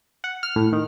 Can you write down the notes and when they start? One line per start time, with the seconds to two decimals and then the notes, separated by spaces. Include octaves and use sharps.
0.24 F#5
0.43 F6
0.56 A2
0.72 D#3